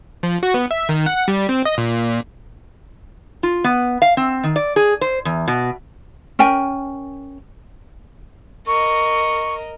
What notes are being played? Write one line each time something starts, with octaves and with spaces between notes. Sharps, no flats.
F3
F#4
B3
E5
D#3
F#5
G3
C4
D#5
A#2
F4
B3
F5
C4
D#3
D5
G#4
C5
E2
B2
C#4 A#4 G5 G#5
A#4 D#5 C#6